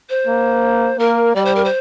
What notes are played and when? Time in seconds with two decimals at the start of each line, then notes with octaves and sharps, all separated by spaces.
0.09 C5
0.27 A#3
0.99 A#3 A#4
1.35 G3 D5
1.45 C5
1.55 A#4
1.64 C5